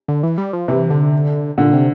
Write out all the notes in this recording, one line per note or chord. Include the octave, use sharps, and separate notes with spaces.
D3
E3
G3
F3
C3 E3
D3
A#2 D3
C3